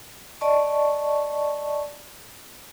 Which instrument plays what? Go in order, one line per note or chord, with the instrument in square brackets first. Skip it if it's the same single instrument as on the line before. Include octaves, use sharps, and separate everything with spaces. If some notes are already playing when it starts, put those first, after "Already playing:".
[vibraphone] D5 D#5 A5 C#6